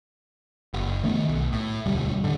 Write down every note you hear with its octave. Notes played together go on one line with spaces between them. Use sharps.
F#1
D#3 A3 B3
B1
A2
E1 D2 G3
A2 D3